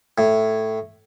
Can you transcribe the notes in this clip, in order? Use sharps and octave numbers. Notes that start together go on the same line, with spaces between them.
A2